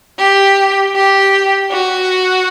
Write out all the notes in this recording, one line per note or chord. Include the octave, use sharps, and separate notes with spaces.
G4
G4
F#4